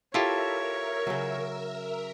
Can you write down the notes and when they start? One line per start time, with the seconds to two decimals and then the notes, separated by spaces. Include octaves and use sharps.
0.14 E4 F4 G4 A4 A#4 C#5 E5
1.07 C#3 F#3